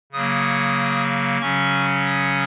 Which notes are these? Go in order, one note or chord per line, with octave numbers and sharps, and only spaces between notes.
C#3 F#3 A#3 D#6
C#3 F#3 C#4 C#6
D#6